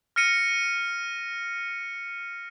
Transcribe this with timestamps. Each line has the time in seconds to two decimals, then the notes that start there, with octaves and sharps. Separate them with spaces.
0.16 F6 A#6 C#7 D#7